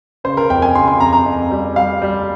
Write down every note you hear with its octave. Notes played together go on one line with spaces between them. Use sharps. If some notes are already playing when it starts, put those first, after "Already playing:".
C#3 C5
A#4
F2 G5
G#5
C#3 C6
C6
F2 A#5
A#5
F2
G3
G3 F5
G3